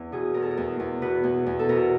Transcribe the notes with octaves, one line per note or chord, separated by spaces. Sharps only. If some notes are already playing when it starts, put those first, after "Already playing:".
Already playing: E2
B2 G#4
E2 A#4
A4
A#4
E2
E2
B2 B4
E2
E2
A4
B2 A#4